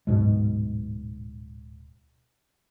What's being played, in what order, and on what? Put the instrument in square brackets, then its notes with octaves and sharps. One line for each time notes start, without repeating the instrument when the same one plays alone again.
[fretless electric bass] D1 G#2 B2 G#3